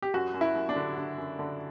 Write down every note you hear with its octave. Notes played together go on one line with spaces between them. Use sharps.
G4
F#2 F#4
F#2
E4
F#2
D4
D3
D3
F#2
D3